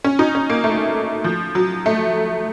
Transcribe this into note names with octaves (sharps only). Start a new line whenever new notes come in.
C#4
D#4
C#4
A#3
A3
F3
F#3
A3